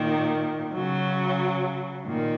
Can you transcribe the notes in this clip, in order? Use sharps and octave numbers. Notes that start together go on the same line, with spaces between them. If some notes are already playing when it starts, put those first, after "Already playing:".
Already playing: A#2 D#3
C#3 F#3
A#2 D#3